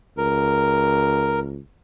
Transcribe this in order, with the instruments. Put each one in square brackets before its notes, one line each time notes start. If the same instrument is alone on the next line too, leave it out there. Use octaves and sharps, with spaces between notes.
[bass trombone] C#2 [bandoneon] A#4